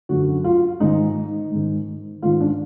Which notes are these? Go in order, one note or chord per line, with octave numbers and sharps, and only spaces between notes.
F#2 D3 F#4
F4
G#2 D#3 D#4
G#2 D#3
G#2 D#3 F4
D4